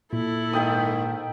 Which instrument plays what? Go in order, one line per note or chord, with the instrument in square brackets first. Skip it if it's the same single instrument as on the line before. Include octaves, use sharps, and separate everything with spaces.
[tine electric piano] A#2 [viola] E4 A4
[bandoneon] G#2 D#3 [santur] E5 G5 D#6